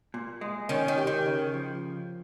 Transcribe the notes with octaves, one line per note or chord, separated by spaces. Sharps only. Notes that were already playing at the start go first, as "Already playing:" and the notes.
A#2
G#3
D#3 C#4
D#3
G4
D#3
C#3
F3